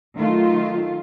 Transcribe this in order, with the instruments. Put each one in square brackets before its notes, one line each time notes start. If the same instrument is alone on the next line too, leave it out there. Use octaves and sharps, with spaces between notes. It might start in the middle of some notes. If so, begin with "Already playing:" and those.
[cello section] D#3 F#3 A3 F4